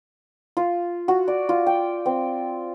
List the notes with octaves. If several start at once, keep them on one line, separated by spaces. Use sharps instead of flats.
F4
F#4
D5
F4
G5
C4